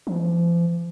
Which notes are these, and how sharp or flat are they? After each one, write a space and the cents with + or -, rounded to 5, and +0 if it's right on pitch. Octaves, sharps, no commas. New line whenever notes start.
F3 -40